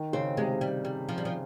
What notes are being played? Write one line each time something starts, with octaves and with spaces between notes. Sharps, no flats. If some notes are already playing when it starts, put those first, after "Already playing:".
Already playing: D#3
C#3 C4
C3 G#3
G3
G3
F3
G3
F3